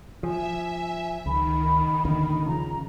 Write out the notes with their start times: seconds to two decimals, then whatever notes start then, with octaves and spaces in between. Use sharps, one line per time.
0.23 F3 E5 G#5
1.26 C#2 D#3 B5
2.05 A1 D#2 D3
2.46 C#3 F3 A#5